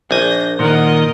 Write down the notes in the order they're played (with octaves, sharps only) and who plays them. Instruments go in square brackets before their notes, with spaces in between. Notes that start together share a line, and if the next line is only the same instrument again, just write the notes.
[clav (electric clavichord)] A#1 G#5 [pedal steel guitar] D4 [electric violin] G6 A#6
[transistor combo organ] A#2 D#3 [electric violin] A#4 D#5 [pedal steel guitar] F#5 C6